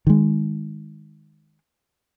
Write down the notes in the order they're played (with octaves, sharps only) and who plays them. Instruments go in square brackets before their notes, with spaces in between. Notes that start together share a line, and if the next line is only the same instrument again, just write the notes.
[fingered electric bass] D#3 G#3